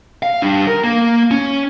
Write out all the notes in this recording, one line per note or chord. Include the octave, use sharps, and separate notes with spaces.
F5
G3 D4
A#4
A#3
C#4